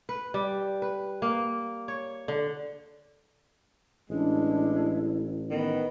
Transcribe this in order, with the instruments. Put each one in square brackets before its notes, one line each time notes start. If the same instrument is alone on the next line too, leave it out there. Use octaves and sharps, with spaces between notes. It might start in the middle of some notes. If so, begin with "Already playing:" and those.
[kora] B4
G3
B4
A#3
C#5
D3
[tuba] A1 [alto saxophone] G#3 [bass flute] D4 [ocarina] E4
[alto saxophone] D#3 [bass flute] B3